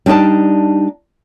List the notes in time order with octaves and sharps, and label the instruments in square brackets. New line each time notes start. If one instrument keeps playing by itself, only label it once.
[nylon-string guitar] G3 D4 D#4 D5 A5